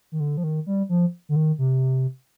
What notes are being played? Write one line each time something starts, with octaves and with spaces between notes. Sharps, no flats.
D#3
D3
F3
D#3
G3
F3
D3
D#3
C3